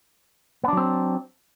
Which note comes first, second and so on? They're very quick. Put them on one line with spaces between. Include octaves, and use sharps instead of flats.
B3 D4 F#3 C4